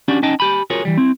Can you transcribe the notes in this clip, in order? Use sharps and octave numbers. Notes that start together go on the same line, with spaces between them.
C#4 D4 F#4 G4 D5
C#4 D#4 D#5 G5 A5
G4 G#5 B5
F4 F#4 G#4 A#4 C#5
E3 G3
C4 E4